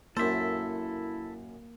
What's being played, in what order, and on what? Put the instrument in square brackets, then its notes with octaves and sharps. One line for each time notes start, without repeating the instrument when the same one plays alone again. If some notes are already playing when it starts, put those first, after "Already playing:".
[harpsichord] F#2 C5 [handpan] A#3 [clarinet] E4 [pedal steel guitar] A4 E5